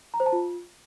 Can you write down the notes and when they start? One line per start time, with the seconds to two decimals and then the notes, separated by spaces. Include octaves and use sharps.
0.14 A#5
0.20 C5
0.26 A5
0.33 F4